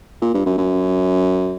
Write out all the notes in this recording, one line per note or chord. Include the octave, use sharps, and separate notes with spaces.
A#2
G2
F#2
F#2